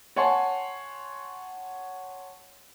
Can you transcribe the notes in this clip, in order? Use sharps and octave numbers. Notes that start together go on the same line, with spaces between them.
C#5 F#5 G#5 A5 C6